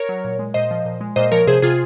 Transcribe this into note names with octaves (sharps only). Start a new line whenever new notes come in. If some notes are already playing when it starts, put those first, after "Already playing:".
Already playing: A#4 C#5
F#3
A#2
G#3
A#2 C5 D#5
F3
A#2
G#3
A#2 C5 D#5
F3 A#4 C#5
C3 G#4 C5
C3 F4 G#4